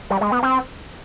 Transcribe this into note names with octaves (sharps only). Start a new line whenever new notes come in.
G3
G#3
B3
C4